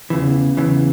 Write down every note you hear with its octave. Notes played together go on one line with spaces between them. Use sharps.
E2 C#3 E3
E2 C#3 E3